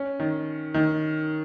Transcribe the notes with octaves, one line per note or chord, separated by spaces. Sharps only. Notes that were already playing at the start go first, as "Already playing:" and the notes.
Already playing: C#4
D#3
D#3